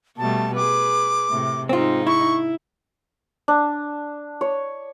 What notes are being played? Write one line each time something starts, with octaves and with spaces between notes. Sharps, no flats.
B2 G3 A3 A5
G#4 B4 D6
A2 C3
G#2 C4 D#4 F4
E4 C#6
D4
C#5